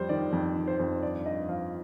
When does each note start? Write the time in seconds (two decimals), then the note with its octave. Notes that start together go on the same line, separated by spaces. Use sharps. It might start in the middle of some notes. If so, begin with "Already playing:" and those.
Already playing: F2 G3 C5
0.09 D#3 D5
0.33 F2
0.56 D#3
0.68 C5
0.80 F2
1.03 G2 D5
1.26 G2 D#5
1.49 F3 F5